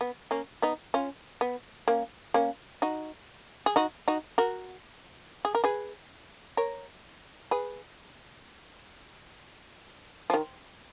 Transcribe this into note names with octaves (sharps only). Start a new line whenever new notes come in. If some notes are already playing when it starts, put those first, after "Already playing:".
B3
A#3 C#4
B3 D#4
C#4 F4
B3
A#3 C#4
A#3 C#4
D#4 F#4
G#4
D#4 F#4
D#4 F#4
F#4 A#4
G#4
A#4
G#4 B4
A#4 C#5
G#4 B4
F3
D#3